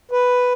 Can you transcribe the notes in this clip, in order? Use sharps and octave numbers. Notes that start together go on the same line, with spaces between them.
B4